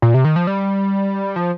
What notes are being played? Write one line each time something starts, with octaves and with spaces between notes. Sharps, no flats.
A#2
C3
D#3
F3
G3
F3